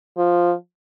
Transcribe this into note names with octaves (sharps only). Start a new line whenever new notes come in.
F3